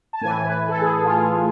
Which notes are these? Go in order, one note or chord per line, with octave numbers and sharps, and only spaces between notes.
A5
A2 E3 G#5
B4
A4
G#4
G#4
F4
G#4